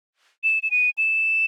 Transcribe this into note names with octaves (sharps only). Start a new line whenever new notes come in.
E7
E7
D#7
E7